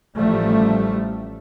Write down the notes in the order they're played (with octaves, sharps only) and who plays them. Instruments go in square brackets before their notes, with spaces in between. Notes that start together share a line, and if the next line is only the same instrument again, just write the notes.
[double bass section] A1 F3 G3 A3